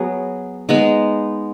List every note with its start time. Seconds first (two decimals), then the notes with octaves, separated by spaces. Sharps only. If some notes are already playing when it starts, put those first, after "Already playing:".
Already playing: F#3 B3 G#4
0.69 G#3 B3 D#4